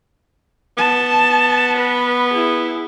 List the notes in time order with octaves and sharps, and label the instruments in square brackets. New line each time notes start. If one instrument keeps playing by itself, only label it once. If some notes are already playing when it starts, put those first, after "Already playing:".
[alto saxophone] B3 [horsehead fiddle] A5
[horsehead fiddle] B4
E4 G#4